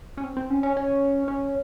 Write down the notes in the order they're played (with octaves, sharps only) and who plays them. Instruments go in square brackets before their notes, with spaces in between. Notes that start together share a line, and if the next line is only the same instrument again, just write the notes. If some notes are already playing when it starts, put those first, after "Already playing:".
[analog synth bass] C#4
C4
C4
C#4
C#4
C#4
C#4